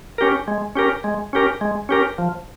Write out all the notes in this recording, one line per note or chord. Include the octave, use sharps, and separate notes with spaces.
C#4 G4 A#4
G#3
C#4 G4 A#4
G#3
C#4 G4 A#4
G#3
C#4 G4 A#4
F3